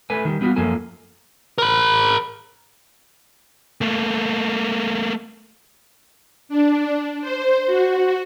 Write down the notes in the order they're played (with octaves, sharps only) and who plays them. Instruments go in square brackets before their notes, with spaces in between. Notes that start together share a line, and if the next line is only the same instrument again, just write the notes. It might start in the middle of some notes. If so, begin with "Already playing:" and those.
[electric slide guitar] A3 B4 G#5
D#3 G3
G3 B3 D#4 F4 F#4
F#2 F3 A#3 A4 G#5
[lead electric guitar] A#4 B5
A3 A#3
[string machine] D4
C5
F#4